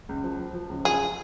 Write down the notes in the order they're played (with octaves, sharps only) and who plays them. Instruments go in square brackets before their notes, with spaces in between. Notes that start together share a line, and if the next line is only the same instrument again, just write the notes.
[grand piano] C#2
F3
F3
F3
C#2
[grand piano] F3 [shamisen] G#4